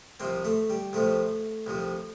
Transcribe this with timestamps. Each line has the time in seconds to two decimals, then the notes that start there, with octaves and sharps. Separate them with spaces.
0.20 C2 C3 F3 C4
0.45 A3
0.70 G3
0.93 C2 C3 F3 A3
1.67 C2 C3 F3